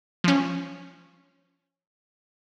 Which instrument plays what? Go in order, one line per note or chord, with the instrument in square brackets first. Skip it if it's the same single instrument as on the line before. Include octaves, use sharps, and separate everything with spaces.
[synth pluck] F3 C#4